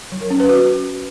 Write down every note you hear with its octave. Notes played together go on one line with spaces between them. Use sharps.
F#3
A#4
C#4
B4
F#4